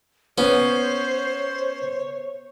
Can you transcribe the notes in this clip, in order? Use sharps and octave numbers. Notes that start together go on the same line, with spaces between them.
B3 C#4 C5 C#5